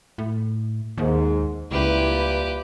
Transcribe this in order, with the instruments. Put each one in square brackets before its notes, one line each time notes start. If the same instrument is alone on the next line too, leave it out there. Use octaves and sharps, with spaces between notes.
[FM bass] A2
[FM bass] D#2 [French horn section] G#2
[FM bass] C#2 [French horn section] G2 A#2 E4 [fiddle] G4 B4